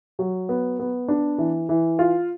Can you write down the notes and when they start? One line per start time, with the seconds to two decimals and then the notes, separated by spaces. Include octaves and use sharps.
0.19 F#3
0.49 B3
0.79 B3
1.08 D4
1.38 E3
1.69 E3
1.99 F4